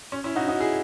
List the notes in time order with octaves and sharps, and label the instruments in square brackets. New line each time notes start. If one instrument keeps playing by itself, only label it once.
[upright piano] C#4
C#4 E4
D#4 F#4
D#4 F#4
E4 G#4